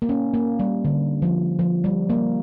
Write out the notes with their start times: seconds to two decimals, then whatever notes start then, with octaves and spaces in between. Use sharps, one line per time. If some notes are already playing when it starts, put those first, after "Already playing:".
0.02 A#3
0.09 C#4
0.34 A#3
0.60 G3
0.85 D3
1.22 F3
1.59 F3
1.84 G3
2.10 A#3